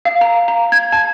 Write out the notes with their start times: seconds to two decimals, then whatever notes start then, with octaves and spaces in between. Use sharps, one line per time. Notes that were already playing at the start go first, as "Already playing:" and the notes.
0.05 F5
0.21 A#5
0.48 A#5
0.72 G#6
0.92 A5